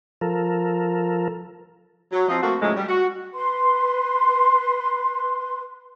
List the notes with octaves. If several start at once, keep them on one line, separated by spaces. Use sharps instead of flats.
F3 A4 A#4
F#3
F3 C4 D#5
A3 A#3 C4 F#4
A2 C#3 F3 F#3 G#3 A3
G3
F#4
B4 C6